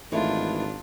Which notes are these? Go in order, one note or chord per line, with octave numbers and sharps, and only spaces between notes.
G#1 D#3 E3 A3 D4 F4